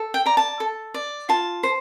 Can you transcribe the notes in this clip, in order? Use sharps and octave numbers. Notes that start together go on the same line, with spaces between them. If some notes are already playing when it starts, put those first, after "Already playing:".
Already playing: A4
G5
D5 A#5
A5
A4
D5
F4 A5
C5